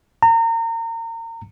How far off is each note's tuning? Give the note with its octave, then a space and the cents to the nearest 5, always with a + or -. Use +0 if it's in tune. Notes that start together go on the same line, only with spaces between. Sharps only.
A#5 -30